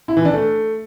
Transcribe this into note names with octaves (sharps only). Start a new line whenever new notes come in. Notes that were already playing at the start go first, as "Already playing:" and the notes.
E4
E3
D4
A3